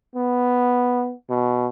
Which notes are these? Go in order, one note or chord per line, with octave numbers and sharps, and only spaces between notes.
B3
B2